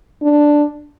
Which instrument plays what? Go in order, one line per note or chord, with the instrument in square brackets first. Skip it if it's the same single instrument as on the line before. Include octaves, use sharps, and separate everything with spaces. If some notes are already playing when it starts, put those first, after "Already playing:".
[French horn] D4